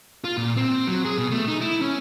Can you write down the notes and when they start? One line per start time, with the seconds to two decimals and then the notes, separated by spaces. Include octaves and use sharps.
0.24 F4
0.38 A#2
0.57 C4
0.88 F#3
1.05 G#4
1.18 B2
1.31 A3
1.48 D#4
1.61 E4
1.82 C#4